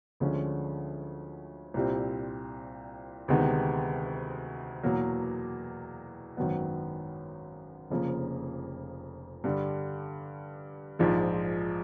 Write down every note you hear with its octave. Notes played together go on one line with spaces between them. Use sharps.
D2 D3 F3 G#3 C#4
C2 A#2 G3 C4
D2 C3 D#3 G#3 B3
E2 B2 F#3 A#3
G#1 F#2 D#3 F#3 B3
F1 F2 C#3 F3 A#3
G2 D3 G3
A#1 G#2 F3 G#3